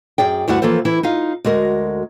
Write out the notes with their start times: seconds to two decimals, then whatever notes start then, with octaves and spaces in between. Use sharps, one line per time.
0.18 F#2 G#4 D5 G5
0.48 D2 G2 E4 F#4 F#5
0.62 E3 F3 A#3 A4 C5
0.85 E3 E4
1.03 D#4 F4 F5
1.44 D2 G#3 F#4 A#4